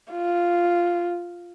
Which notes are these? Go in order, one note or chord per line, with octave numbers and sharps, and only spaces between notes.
F4